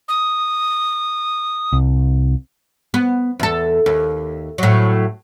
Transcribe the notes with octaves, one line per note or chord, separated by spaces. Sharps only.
D#6
C2
B3
E2 A4
D#2
A2 F#3